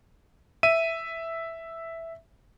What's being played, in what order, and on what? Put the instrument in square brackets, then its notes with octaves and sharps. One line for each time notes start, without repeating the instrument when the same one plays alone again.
[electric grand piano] E5 D#7